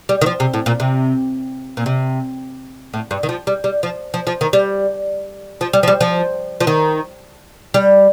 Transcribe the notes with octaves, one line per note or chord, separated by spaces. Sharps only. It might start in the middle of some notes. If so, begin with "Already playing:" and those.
G3
D#3
F3
C3
A2
A#2
C3
A#2
C3
A2
G2
D#3
F3
G3
G3
F3
F3
F3
D#3
G3
F3
G3
F3
G3
F3
F3
D#3
G3